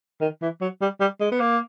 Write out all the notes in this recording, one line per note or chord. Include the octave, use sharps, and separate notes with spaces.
D#3
E3
F#3
G3
G3
G#3
B3
A#3